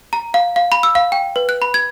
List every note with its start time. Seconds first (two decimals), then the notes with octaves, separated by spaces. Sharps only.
0.13 A#5
0.34 F5
0.56 F5
0.72 B5
0.83 E6
0.95 F5
1.12 G5
1.36 B4
1.49 F#6
1.62 B5
1.74 G#6